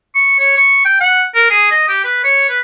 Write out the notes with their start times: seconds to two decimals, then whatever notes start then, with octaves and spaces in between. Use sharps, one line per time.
0.15 C#6
0.39 C#5
0.58 C#6
0.85 G5
1.01 F#5
1.35 A#4
1.50 G#4
1.71 D#5
1.89 G4
2.04 B4
2.24 C#5
2.49 B4